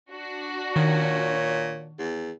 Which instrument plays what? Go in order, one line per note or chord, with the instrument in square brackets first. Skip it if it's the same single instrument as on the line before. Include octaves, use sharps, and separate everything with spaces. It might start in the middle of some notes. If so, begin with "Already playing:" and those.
[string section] D4 F#4
[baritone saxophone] A#2 [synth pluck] D#3 [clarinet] C#5
[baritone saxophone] E2